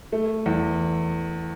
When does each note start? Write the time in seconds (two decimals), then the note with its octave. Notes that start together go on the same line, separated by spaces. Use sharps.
0.12 A3
0.46 E2